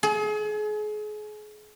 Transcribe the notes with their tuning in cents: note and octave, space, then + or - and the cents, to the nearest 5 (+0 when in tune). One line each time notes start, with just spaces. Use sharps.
G#4 +35